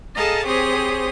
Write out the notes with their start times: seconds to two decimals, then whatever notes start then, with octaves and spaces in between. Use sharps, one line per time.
0.15 G#4 A4 D#5 F5 A5 A#5
0.45 C4 G4 G#4 C5 C#5 D#6